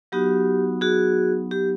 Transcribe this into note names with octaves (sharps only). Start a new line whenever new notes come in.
F#3 B3 D#4 F#4 G4
F#4 G#4
G4